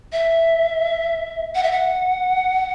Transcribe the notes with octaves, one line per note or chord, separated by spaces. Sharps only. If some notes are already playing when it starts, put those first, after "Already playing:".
E5
F#5
E5
F#5